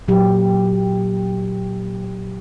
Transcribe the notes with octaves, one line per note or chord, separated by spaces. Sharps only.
A#2 F#3 G4